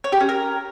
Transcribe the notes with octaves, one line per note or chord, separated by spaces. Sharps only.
C#5
G4
C#4
A#4